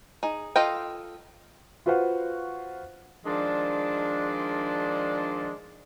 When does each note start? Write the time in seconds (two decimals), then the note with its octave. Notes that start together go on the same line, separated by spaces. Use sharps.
0.23 D#4 G#4
0.56 F4 A4 D#5 F5 G5
1.86 F4 F#4 B4 C5 F5 F#5
3.26 D#3 F3 G#3 D4